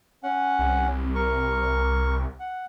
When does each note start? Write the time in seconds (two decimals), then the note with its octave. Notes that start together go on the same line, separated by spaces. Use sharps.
0.23 C#4 F#5
0.59 C2
1.15 A#4 C#6
2.40 F#5